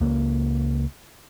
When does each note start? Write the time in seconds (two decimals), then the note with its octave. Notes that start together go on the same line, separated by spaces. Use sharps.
0.01 C#2 A#3